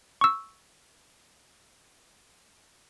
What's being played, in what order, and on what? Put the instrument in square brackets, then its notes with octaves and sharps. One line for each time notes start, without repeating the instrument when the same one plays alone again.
[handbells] C#6 E6